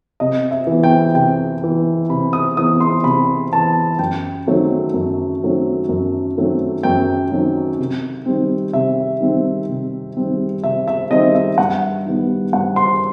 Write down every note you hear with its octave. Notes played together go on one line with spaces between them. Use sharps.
C3 D#5
E5
E3 B3
G5
C3 G5
E3 B3
C3 B5
D#6
E3 B3 D#6
C6
C3 B5
E3 B3 A5
F#2 G5
D#3 F#3 A3 C4
F#2
D#3 F#3 A3 C4
F#2
D#3 F#3 A3 C4
F#2 G5
D#3 F#3 A3 C4
C3
D#3 G3 C4
C3 E5
D#3 G3 C4
C3
D#3 G3 C4
C3 E5
E5
D#3 G3 C4 D#5
E5
G2 F#5
D#3 G3 B3
G2 F#5
C6